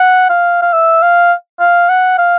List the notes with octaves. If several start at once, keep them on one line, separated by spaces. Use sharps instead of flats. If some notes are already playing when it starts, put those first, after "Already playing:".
Already playing: F#5
F5
F5
E5
F5
F5
F#5
F5